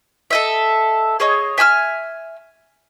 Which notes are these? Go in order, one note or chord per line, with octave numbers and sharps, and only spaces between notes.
A4 D#5 E5
G#4 C#5 D#5
E5 G#5 E6 F6